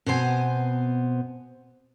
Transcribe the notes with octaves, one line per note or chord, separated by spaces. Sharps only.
B2 B3 C4 C5 G#5